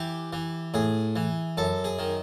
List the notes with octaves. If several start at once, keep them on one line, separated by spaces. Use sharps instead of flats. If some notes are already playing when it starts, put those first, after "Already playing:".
Already playing: E3 G4
E3
A2 G#4
E3
F#2 A4
G#4
D#3